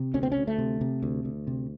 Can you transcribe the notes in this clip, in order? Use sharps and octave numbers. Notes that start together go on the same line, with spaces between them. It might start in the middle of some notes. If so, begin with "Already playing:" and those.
Already playing: C3
D2 C#4
C4
D2 C#4
A3
C3
C3
D2
D2
C3